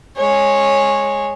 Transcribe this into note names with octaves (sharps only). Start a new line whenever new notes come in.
G#3 C#5